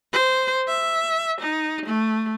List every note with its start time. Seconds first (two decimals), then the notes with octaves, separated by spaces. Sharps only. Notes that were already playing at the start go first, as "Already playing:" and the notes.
0.13 C5
0.68 E5
1.40 D#4
1.86 A3